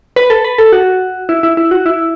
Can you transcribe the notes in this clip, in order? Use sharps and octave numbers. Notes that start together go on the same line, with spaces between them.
B4
A4
B4
A4
F#4
E4
E4
E4
F#4
E4